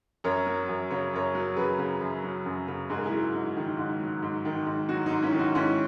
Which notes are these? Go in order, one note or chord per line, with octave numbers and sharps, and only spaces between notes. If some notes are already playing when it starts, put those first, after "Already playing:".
F#2 A#4 C#5
F#3
F#2
C#3 C#5
F#2 A#4 C#5
F#3
F#2 G#4 B4
C#3
F#2
F#3
F#2
C#3
G#2 G#4
A#4
E4 G#4
F#3
G#2
D#3
G#2
F#3
G#2
D#3
G#2
F#3 D#4 F#4
D#4
G#2
C#4 E4
D#3
D#4 F#4
G#2 C#4 E4